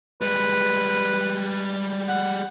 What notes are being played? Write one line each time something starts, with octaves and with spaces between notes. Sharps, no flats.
G3 G#3 B4
F#5